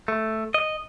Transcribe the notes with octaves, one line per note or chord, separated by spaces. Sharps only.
A3
D#5